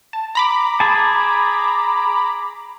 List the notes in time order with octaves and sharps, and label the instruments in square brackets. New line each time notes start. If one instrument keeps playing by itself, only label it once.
[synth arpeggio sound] A5
A#5 B5 D6
[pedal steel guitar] G#4 A5